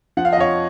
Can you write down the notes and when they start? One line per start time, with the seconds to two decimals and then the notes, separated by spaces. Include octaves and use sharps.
0.17 F3 F#5
0.25 F5
0.33 D#5
0.37 F2 C#5 F5